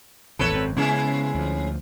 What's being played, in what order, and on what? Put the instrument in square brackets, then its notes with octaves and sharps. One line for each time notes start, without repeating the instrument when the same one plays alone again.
[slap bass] A#1 E2 C3 [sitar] A4 B4 C#5
[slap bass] G#1 F#2 C4
[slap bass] C#3 B3 [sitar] G#3 C#4 E4
[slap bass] D2 F3